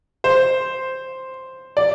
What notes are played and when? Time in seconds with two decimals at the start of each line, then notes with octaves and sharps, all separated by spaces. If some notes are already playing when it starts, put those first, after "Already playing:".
0.24 C5
1.77 D5